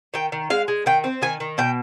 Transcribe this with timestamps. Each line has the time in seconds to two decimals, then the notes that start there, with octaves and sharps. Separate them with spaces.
0.14 D#3 G5
0.32 D#3
0.50 G#3 F5
0.68 G#3
0.86 D#3 G5
1.04 C4
1.22 D#3 G#5
1.40 D#3
1.58 B2 G5